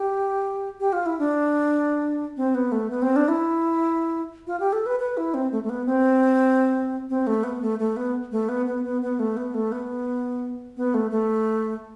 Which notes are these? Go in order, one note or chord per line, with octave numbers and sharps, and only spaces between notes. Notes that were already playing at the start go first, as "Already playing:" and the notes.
Already playing: G4
G4
F4
E4
D4
C4
B3
A3
B3
C4
D4
E4
F4
G4
A4
B4
B4
E4
C4
A3
A3
B3
C4
C4
A3
B3
A3
A3
B3
A3
B3
B3
B3
B3
A3
B3
A3
B3
B3
A3
A3